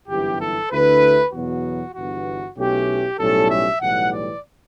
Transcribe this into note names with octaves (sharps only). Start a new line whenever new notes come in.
G1 F#2 E3 B3 E4 G4
A4
D2 D3 A3 E4 B4
E2 B2 F#3 B3 F#4
G1 G2 E3 B3 F#4
B1 B2 A3 C#4 E4 G4
B1 A2 G3 C#4 E4 A4
E5
B1 A2 E3 G3 F#5
D5